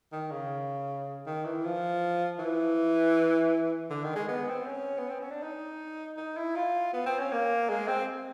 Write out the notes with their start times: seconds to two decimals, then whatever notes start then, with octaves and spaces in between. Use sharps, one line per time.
0.12 D#3
0.31 C#3
1.26 D#3
1.45 E3
1.64 F3
2.39 E3
3.90 D3
4.04 D#3
4.15 G#3
4.28 B3
4.48 C4
4.66 C#4
4.98 B3
5.09 C4
5.21 C#4
5.31 D4
5.43 D#4
6.17 D#4
6.37 E4
6.55 F4
6.93 B3
7.06 C4
7.19 C#4
7.32 A#3
7.69 G#3
7.88 C4